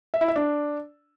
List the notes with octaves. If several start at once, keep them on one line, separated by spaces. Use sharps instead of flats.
E5
E4
E5
D4